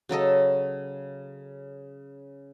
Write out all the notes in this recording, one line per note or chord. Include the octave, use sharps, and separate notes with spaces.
C#3 F#3 A4 D#5